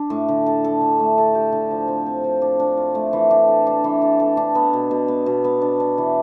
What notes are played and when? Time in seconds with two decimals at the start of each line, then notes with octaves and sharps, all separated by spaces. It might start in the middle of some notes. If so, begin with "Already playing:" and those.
Already playing: D4
0.10 A2
0.29 D3
0.46 A4
0.64 A4
0.81 D3
0.99 A3
1.18 A4
1.35 G4
1.52 D3
1.71 F3
1.88 C4
2.06 C4
2.24 F3
2.42 D4
2.60 D4
2.77 F4
2.95 A3
3.13 E3
3.31 D4
3.48 A4
3.67 D4
3.84 E3
4.02 A4
4.20 A4
4.37 D4
4.55 B3
4.73 B2
4.91 B2
5.08 B3
5.26 B2
5.44 B3
5.62 D4
5.80 D4
5.98 E3